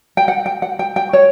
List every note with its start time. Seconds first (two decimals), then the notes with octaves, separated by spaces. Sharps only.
0.17 G5
0.28 F#5
0.46 G5
0.62 F#5
0.79 G5
0.96 G5
1.13 C#5